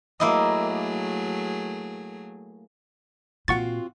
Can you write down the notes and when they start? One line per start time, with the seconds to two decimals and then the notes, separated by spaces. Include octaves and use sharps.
0.20 F#3 A3 A#3 E4 G#4 D#5
3.48 A#2 C4 F4 F#4 F#5 C#6 A6